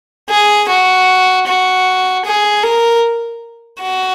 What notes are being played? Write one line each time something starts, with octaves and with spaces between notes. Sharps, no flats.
G#4
F#4
F#4
G#4
A#4
F#4